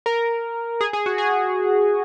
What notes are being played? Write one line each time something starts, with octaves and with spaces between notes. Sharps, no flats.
A#4
G#4
G#4
F#4
G#4